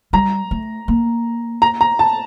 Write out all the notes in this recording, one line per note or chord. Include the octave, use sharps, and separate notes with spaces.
G3 A#5
A3
A#3
A#5
A#5
A5